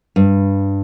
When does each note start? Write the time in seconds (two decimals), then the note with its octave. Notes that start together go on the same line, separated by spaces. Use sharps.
0.16 G2